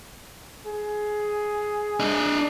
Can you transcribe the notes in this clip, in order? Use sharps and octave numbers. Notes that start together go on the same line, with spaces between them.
G#4
D4 D#5